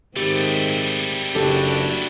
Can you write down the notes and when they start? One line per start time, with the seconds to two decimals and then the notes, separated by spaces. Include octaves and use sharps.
0.16 G#2 D#3 G3 A3 C4 G4
1.35 F#1 D4 F#4 G4 A4